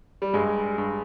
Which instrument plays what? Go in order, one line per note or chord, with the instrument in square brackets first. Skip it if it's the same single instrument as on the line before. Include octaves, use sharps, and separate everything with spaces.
[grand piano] G3
[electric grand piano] G2 [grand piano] G#3
[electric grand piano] G2